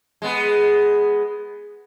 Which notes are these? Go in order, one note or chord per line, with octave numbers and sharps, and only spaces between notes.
G#3 B3